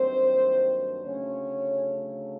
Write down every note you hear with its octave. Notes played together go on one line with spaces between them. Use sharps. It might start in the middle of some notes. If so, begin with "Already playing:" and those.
Already playing: G2 D#3 F#3 A#3 C4 C5
D2 C#3 F#3 A3 C#4 C#5